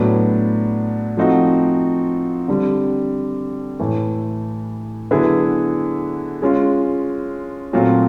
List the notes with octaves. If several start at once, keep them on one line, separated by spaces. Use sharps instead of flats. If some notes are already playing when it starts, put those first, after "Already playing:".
Already playing: A2 F#3 B3 D4
F3 A3 C4 D#4 F#4
D3 G3 C4
A2 E3 A3
D3 F#3 B3 E4 G#4
G#3 C#4 F4
A#2 F#3 A3 C4 F4